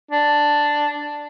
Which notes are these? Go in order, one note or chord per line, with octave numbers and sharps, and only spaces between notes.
D4